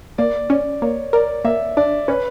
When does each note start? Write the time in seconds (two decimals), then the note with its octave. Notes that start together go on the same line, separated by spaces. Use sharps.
0.18 A#3 D5
0.50 C#4 D5
0.82 A#3 C#5
1.13 A#4 D5
1.45 A#3 E5
1.77 D4 D5
2.08 C#4 B4